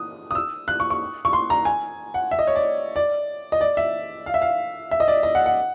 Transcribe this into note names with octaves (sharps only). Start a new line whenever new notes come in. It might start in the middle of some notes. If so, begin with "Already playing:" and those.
Already playing: D#6
D#6
E6
F#6
C#6
C#6
C#6
C6
A#5
G#5
F#5
E5
D#5
C#5
D5
D5
D#5
D5
E5
F5
E5
F5
E5
D#5
D5
D#5
F#5
F#5